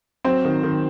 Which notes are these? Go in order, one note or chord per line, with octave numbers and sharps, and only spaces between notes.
F#3 C4 C5
D#3
D#3